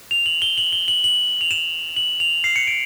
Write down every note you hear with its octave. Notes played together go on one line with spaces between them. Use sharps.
F7
F#7
G7
F#7
G7
F#7
F#7
F7
E7
F#7
F7
C7
C#7
D7